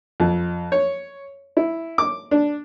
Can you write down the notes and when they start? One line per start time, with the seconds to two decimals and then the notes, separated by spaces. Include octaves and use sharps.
0.20 F2
0.72 C#5
1.57 E4
1.98 D6
2.31 D4